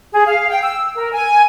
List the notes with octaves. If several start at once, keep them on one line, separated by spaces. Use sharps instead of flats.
G#4
F5
G5
E6
A#4
G#5